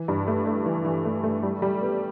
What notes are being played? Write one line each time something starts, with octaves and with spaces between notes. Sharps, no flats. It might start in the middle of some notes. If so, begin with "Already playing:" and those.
Already playing: E3
G2
A3
A3
E3
E3
A3
A3
G3
G3
B3